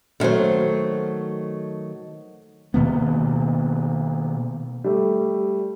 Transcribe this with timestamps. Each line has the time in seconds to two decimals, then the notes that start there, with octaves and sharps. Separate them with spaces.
0.20 D3 D#3 F#3 A3 C5
2.74 B2 D#3 A#3 B3
4.84 G3 A3